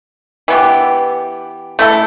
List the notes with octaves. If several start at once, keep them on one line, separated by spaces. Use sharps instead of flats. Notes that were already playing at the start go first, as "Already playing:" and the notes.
E3 B3 G4
A3 E4 A4